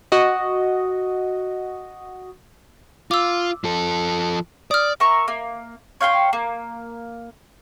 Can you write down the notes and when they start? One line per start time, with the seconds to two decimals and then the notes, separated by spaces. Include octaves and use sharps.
0.12 F#4 D#5
3.11 F4 D6 E6
3.64 F3 A4
4.71 D5 D#6 F6
5.00 A#4 E5 C#6
5.28 A#3
6.00 C#5 F5 G5 C6
6.33 A#3